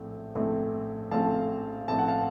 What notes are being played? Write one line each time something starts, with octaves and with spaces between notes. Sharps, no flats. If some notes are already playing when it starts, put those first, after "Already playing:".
Already playing: A#1 A2 A3 C4
A#1 A2 A3 C4
A#1 A2 A3 C4 F5 A5
A#1 A2 A3 C4 A5
F#5
F5 A5